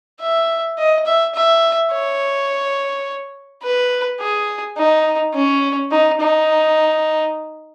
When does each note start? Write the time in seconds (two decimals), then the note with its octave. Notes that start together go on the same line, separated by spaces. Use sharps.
0.20 E5
0.78 D#5
1.06 E5
1.34 E5
1.92 C#5
3.63 B4
4.20 G#4
4.77 D#4
5.34 C#4
5.91 D#4
6.20 D#4